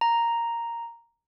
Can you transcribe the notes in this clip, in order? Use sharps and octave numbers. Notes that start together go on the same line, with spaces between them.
A#5